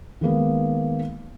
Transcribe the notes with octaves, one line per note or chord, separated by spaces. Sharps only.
D#3 G#3 A#3 B3